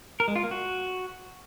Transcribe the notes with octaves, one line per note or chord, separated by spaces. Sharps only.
A#4
G#3
F4
A#3
F#4